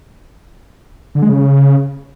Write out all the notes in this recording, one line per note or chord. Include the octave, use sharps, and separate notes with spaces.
D3
G#3
C#3